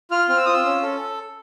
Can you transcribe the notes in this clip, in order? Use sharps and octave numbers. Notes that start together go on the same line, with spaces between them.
F4 F6
C4 F6
E6
F4 D#6
E6
C#4
A4